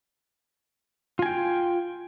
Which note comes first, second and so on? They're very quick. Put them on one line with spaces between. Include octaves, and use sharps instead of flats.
F4 G#5 G5